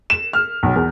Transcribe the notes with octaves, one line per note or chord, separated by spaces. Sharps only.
E7
F6
B1
E2